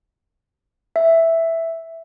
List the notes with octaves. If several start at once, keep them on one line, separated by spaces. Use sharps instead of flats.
E5